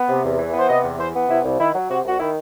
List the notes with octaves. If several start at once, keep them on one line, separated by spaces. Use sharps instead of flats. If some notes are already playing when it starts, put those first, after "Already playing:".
Already playing: B3
C3
E2
E3
B3
C5
C3 D#5
E2
E3 C5
B3
C3 E4
C2
D#3 E4
F#3
C3 F#4
C2 F#4
D#3 E4